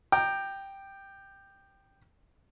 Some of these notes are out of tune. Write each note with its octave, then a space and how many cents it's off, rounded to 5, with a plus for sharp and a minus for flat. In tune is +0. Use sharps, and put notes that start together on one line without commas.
G5 +0 A#5 -5 D6 +35